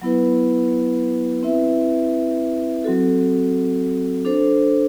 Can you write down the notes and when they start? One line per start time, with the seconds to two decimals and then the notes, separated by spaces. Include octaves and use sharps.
0.02 F#3 B3 E4 B4
1.43 C4 E4 B4 E5
2.84 F#3 C4 F#4 A4
4.25 D4 A4 C5